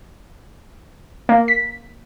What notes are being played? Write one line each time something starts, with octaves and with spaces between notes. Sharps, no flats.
A#3
B6